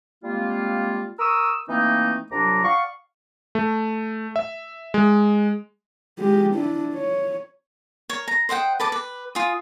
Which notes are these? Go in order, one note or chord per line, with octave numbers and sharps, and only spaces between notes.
G3 G#3 A#3 C4 F4
A#4 C#6 D#6 E6
E3 A3 A#3 C4 D#4
C2 F#3 D4 F4 A#5 D6
D5 F5 F#5 C#6
A3
E5
G#3
G#3 G4
D4 E4
C#5
A#4 C#5
A#5
C5 D#5 F#5 G5
B4 A5 D6
B4
F4 G#5 D#6